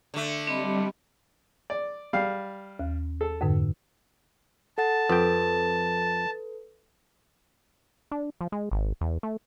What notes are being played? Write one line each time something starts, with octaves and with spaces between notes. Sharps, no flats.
D3 A3
G3 C4 D#5 B5
D5
G3 F5
D#2
A4
F2 G#2 D3
A4 F#5 A5 A6
F2 A4 B4 G5
D4
F3
G#3
G#1
E2
A3